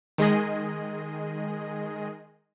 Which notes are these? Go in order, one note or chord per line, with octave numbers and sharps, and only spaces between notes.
D#3 G#3 G#4 D#5